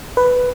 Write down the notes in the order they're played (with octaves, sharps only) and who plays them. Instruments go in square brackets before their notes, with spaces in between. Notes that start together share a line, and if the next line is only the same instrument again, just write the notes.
[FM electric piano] B4